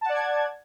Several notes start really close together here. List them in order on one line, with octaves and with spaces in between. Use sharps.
A5 F#5 D5 G#6